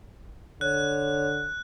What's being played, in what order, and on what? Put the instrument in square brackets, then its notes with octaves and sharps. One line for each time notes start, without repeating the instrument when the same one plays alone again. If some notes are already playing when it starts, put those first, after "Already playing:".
[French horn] D3 [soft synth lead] C#5 [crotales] F#6